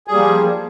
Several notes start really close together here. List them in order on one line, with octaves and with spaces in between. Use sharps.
G#4 G3 A#3 F3